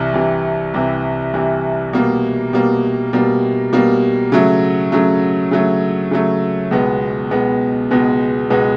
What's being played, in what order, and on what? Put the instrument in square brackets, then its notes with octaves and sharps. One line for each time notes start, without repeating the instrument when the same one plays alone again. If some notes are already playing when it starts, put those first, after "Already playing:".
Already playing: [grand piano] C2 C3 E3
C2 C3 E3
C2 C3 E3
C2 C3 E3
B2 G3 A#3
B2 G3 A#3
B2 G3 A#3
B2 G3 A#3
C#3 F#3 A3
C#3 F#3 A3
C#3 F#3 A3
C#3 F#3 A3
C#2 B2 G#3 B3
C#2 B2 G#3 B3
C#2 B2 G#3 B3
C#2 B2 G#3 B3